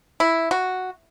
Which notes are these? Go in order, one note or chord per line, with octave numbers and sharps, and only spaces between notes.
E4
F#4